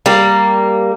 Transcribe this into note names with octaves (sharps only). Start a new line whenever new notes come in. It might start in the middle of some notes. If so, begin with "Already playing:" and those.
G3 A#3